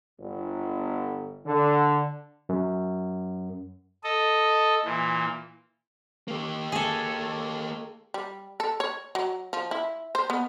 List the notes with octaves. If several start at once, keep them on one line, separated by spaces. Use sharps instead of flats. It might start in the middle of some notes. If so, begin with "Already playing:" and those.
G1
D3
F#2
A4 D#5
A#2 E3
A#3 G4
G#4 A4
G3
A4
C#5
F#3
F3
E4
C5
B3